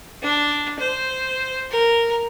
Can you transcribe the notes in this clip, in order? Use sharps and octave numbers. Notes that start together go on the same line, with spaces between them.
D4
C5
A#4